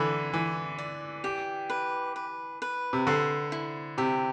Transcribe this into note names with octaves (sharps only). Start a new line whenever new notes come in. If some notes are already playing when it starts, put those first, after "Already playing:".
Already playing: D3 E3 D5 B5
E3 D5
D5
G4
B4
B4
B4
C3
D3 C5
E4
C3 G4